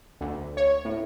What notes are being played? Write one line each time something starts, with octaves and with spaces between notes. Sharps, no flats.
D2
C#5
A2